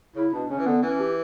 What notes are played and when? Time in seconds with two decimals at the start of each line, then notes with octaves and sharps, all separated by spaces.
0.16 C#3 E4
0.33 B2 D4
0.49 C#3 C#4
0.58 E3
0.66 D3 B3
0.83 E3 C#4
1.00 G4